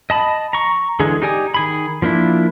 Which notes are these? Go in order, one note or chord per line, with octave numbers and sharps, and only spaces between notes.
D#5 A5 B5
A#5 C#6
D3 E3 G#3 G#4
D#4 G4 D5 G#5 D#6
D#3 G#4 B5
F3 A#3 D4 E4